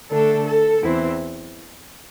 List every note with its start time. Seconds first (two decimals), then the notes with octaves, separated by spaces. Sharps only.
0.11 D3 A3 D4 A4
0.47 A4
0.82 E2 E3 C4 E4